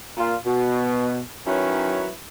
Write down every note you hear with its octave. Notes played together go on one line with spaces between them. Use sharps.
A#2 F4
B2
D#3 F#3 C#4 E4 B4 C#5